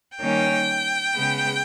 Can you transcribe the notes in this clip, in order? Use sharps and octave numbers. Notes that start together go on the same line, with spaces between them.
D#3 G3 A#3 C#4 G5
C#3 G#3 B3